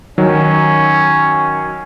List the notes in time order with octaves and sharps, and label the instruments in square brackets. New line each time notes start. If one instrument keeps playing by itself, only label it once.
[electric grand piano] D#3 F#3 [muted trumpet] C#4